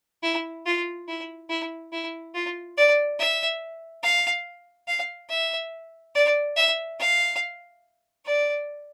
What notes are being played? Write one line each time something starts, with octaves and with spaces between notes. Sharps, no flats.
E4
F4
E4
E4
E4
F4
D5
E5
F5
F5
E5
D5
E5
F5
D5